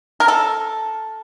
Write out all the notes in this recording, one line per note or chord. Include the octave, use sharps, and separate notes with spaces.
A#4
A4